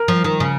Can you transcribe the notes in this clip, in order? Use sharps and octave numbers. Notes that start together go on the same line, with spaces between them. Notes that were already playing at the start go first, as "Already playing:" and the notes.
Already playing: A#4
F3
D#3
C#3